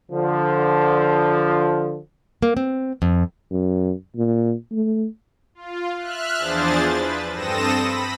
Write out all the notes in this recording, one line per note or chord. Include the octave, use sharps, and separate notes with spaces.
D3 F3
A#3
C4
F2
F#2
A#2
A3
F4
E5 F6 F#6
E2 F3 D4 G#4 C5 A6
B4
G2 C4 A4 D#6 A#6 E7
B5